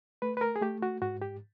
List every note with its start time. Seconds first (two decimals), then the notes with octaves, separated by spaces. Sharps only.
0.22 A3 B4
0.37 B4
0.41 A#4
0.56 G#4
0.61 A3 G4
0.82 F#4
1.02 G#2 F#4
1.22 G4